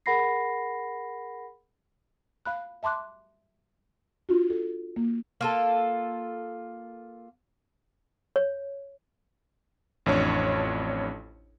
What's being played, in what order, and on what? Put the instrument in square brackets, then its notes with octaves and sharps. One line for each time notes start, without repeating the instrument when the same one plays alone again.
[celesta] G#4 A#4 F#5 B5 A#6 C7
[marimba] F5 B5 F#6
E5 A5 C6 D6 F#6
D4 F4 F#4
A4
A#3
[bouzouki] A#3 F4 A4
[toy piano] C#5
[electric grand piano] A1 F2 D4 C#5